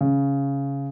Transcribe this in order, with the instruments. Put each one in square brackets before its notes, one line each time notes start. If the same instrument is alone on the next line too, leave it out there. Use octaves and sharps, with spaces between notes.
[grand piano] C#3